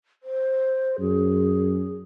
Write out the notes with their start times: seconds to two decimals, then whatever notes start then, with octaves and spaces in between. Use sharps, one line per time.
0.23 C5
1.00 F#2 G#4